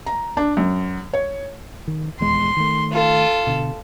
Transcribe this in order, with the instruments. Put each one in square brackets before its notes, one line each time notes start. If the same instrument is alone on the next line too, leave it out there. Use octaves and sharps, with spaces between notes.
[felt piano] A#5
D4
F#2
C#5
[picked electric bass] D#3
[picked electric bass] D#1 E2 G#3 [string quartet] C6
[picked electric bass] D#3 A3
[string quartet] F4 A4
[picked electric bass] B2 D3